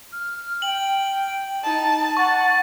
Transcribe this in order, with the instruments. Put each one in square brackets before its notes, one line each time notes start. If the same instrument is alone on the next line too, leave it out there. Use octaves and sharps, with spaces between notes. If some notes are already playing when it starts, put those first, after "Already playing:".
[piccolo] F6
[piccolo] G5 [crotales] F#7
[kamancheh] D#4 [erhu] A5
[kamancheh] F#5 [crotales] C#6 [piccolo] A6